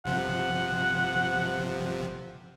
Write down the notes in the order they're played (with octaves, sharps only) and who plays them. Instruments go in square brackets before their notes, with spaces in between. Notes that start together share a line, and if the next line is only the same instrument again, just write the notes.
[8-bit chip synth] G1 C3 F3 [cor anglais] F#5